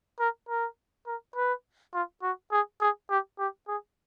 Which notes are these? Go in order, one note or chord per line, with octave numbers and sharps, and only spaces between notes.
A#4
A#4
A#4
B4
F4
F#4
G#4
G#4
G4
G4
G#4